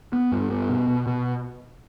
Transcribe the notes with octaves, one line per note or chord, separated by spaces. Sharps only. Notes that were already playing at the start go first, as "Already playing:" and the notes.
B3
G2
B3
B2
B2
B2